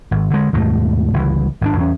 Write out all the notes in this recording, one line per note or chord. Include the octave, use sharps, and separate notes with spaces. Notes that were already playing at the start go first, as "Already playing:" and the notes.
G#1
D3 G#3
D#2 G#2 B2 A3
G1 C#2 E3
G#1 D3 D4
E2 C#4